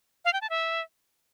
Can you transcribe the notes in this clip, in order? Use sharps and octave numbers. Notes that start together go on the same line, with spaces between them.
F5
G5
A5
E5